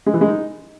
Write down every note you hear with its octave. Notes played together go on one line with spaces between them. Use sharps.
G#3
E3
G#3
D#4